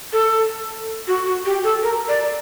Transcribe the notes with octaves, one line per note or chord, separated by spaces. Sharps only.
A4
F#4
F#4
G4
A4
A#4
D5